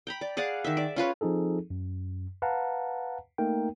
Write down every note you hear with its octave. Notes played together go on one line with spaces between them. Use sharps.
G5 A#5 B5
D5
G#4 D5 F5 F#5
D#3 E5
D5
C#4 F4 B4 C#5
F3 C4 D#4 G#4 A4
F#2
B4 F5 F#5 A5 A#5
A3 A#3 D#4 A#4 G5